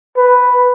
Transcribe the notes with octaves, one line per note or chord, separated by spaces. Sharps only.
B4